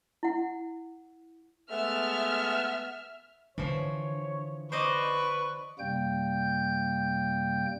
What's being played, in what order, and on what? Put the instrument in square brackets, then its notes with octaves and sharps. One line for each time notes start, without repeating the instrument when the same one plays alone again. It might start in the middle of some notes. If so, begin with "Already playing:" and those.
[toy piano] E4 F#5
[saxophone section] G#3 A3 B3 [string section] E5 F6
[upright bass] D3 [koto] E3 F3 [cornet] C#5
[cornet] B4 [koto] C5 D5 D#5 [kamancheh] C#6
[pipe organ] F#2 C3 G3 A#3 G5 G6